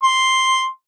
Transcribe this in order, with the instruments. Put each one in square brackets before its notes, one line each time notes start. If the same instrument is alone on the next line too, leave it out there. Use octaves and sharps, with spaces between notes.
[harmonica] C6